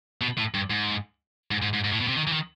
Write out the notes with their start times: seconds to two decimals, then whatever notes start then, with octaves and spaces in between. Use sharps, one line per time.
0.21 B2
0.38 A2
0.54 G2
0.70 G#2
1.51 G#2
1.62 G#2
1.73 G#2
1.84 G#2
1.92 A2
2.00 B2
2.08 C3
2.17 D#3
2.27 E3
2.33 D#3